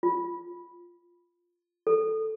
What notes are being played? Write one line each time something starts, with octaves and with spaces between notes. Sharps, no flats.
F4
A4